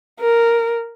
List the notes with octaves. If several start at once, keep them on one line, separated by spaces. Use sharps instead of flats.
A#4